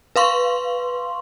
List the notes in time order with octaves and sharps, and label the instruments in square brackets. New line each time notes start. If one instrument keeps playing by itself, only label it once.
[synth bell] B4 F5 C6 C#6